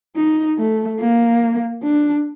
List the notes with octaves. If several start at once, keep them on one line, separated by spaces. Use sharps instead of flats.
D#4
A3
A#3
D4